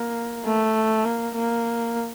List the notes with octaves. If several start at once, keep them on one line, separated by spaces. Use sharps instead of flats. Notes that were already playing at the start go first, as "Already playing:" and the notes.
Already playing: A#3
A3
A#3
A#3